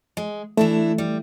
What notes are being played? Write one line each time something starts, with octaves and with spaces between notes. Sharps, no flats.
G#3
E3 A3 D4 E4
G3